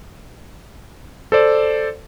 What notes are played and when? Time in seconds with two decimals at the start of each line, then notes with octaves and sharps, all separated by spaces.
1.32 A4 C5 D5